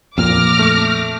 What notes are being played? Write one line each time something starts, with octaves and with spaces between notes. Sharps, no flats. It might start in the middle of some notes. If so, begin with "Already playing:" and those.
F2 A#2 D6 F6 A#6
A3